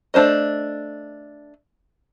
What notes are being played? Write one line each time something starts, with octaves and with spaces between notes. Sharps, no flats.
A3 D4 C5 D#5